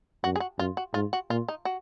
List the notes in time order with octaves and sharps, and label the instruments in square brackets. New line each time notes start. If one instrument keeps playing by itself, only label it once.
[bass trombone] F#2 [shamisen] F#4
[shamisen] G#4
F#4
[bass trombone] F#2 [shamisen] F4
[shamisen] F#4
[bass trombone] G#2 [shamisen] F4
[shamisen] F#4
[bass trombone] A#2 [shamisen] F4
[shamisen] D#4
F#4